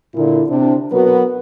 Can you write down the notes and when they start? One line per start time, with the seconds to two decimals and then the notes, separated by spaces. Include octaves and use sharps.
0.15 A#2 D3 E4
0.49 C3 D4
0.91 B2 F#3 B3 F#4 A#4 B4